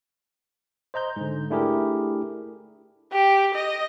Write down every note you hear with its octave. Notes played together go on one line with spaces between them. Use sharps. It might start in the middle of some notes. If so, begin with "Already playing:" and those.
C5 D#5 A#5 G6
G#2 D3
A3 D4 E4 G4 G#4 A#4
G4
D#5